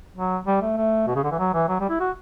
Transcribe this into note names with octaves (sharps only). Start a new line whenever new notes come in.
F#3
G3
A3
A3
B2
C#3
D3
E3
F#3
E3
F#3
G3
E4
F#4